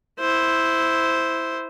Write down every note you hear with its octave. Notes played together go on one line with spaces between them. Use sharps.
E4 C5